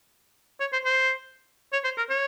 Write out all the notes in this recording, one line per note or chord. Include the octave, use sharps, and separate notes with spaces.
C#5
C5
C5
C#5
C5
A#4
C#5